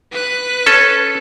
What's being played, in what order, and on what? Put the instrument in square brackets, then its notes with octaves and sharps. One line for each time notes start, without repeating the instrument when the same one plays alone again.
[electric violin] B4 F#6
[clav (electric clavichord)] C#4 A4